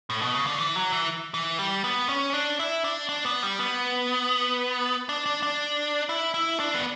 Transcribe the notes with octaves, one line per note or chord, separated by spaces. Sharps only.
A2
B2
C#3
D3
E3
F#3
E3
E3
G3
B3
C#4
D4
E4
D4
D4
B3
G3
B3
D4
D4
D4
E4
E4
D4
B3